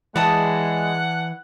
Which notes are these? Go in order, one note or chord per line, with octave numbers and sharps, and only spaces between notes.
E3 G#3 D5 F#5 A5 D#6